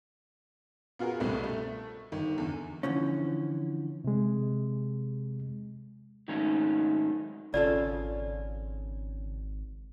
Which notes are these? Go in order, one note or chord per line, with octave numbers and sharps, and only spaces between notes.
B3 F4 F#4 G#4 A#4
C2 G2 B2 G3 A3 C4
A3
G1 D#3
E2 D3
D3 E3 F3 C#4
C3 G#3
G#2 D#3 F#3 A3 C#4 D#4
G#1 C#3 F4 A4 D5